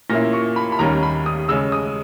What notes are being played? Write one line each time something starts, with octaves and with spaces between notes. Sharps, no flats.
A#2 A#3 C#4 E4 A#6
C#6
B5
B5
D#2 D#3 G3 C#4 A#5
B5
D#6
C#3 G#3 C#4 E6
D#6